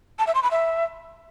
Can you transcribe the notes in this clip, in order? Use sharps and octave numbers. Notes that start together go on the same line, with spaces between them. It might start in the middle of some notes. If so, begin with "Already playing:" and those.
A5
E5
C6
B5
E5